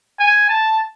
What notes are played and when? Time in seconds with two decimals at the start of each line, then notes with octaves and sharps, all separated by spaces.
0.19 G#5
0.49 A5